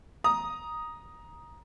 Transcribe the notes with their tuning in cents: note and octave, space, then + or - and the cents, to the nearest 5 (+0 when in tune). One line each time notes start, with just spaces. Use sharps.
A#5 +15 D#6 +0